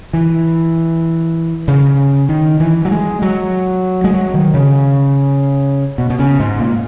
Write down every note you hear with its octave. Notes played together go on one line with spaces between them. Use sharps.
E3
C#3
D#3
E3
F#3
G#3
F#3
G#3
F#3
D#3
C#3
B2
B2
C#3
G#2
A#2